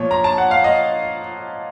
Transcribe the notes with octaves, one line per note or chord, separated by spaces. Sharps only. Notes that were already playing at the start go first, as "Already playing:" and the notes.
Already playing: A#2 F3 C#5
A#5
A5
F#5
F5
D#5